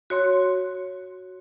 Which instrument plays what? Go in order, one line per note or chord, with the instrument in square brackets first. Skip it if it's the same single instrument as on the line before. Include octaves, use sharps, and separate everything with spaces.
[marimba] F#4 C#5 C6